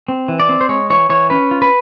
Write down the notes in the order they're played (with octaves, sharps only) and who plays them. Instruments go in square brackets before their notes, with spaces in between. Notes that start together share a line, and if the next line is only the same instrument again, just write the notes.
[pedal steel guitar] C4
E3
D5
C4
C5
G#3 C#5
E3 C#5
E3 C#5
C#4 B4
F4
B4